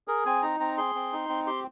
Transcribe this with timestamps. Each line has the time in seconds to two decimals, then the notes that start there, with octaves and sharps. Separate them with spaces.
0.08 G#4 A#4
0.26 C4 G#5
0.42 D#4 A#5
0.60 C4 A#5
0.77 G#4 C6
0.95 C4
1.12 D#4
1.29 C4
1.47 G4 C6